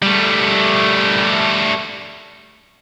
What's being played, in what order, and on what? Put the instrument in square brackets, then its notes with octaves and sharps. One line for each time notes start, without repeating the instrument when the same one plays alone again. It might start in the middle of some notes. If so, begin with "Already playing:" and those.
[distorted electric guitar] G3 A3